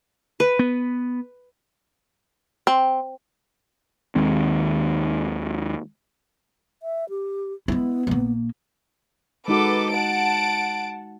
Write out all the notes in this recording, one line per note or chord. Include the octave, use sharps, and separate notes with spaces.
B4
B3
C4
D#2 D#3 G#3 C4
E5
G4
G#3 B3 E4
A#1 A#3
G#3 D#4 F#4 A4 B4 D6
F#5 A5 D7